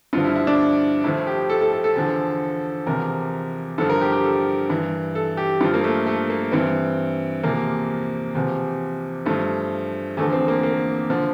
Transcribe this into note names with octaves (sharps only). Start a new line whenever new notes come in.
G2 D3 F3 F4
E4
E4
D4
A2 F3 E4
G4
A4
A4
A4
A4
E2 D3 F3
E2 C3 F3 A#4
G2 D3 F3 A4
A#4
G4
G4
A4
G2 E3
A4
G4
G2 F3 F4
A#3
A3
A3
A#3
G2 E3 C4
E2 C3 F3 A#3
E2 C3 F3
G2 F3 A3
E2 D3 F3 A3
C4
A#3
A#3
D3 F3